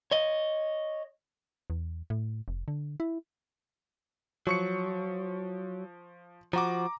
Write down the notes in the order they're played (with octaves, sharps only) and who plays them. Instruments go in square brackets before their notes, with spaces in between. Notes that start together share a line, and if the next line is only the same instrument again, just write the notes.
[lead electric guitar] C#5 D#5
[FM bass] E2
A2
F1
D3
E4
[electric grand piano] F3 C#6 C#7 [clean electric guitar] F#3
[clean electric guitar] F3 F#4 [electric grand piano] A#5 D6